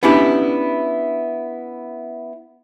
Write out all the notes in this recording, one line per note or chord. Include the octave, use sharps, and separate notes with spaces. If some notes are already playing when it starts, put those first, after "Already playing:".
B3 C#4 D4 E4 G4